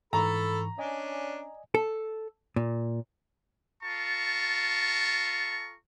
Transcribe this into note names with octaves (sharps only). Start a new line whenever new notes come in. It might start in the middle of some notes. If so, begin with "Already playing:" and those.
G#2 E3 A4 A#5 B5 C#6
C#4 D4 D5 D#5 G#5
A4
A#2
F4 A4 A5 A#5 C#6